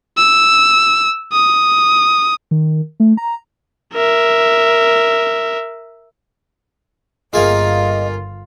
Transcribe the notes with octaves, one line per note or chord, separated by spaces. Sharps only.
E6
D#6
D#3
A3
A#5
A#4 E5
G1 A#3 F4 G#4 D#5